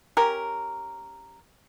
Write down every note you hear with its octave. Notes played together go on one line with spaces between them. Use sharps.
C#4 G4 A#4